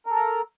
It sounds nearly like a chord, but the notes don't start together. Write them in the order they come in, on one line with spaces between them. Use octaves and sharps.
A#4 A4 A#5